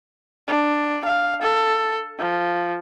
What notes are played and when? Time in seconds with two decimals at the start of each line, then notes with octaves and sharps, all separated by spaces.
0.48 D4
1.05 F5
1.42 A4
2.19 F3